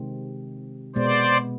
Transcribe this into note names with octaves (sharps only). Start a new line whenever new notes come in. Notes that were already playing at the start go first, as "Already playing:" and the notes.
Already playing: C3 D#3 G#3 C4
B2 G#3 B3 C5 D5